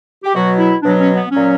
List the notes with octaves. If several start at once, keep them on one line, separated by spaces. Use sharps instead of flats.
G4
B2 F#3 F#4
E4
B2 F#3 D4
C#4
B3
A#2 F#3 C#4